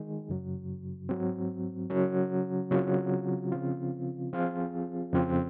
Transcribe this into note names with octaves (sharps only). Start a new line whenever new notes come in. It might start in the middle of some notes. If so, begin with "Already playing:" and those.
Already playing: D#3 G#3 D#4 G#4
F#2 C#3 F#3
G#2 F#3 C4
C#3 F#3 C#4
C#3 F#3 C4 F4
C#3 F3 C4 F4
F3 C4 F4 G#4
F2 C#3 F3 C4